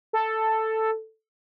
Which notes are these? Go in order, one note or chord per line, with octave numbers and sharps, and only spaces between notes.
A4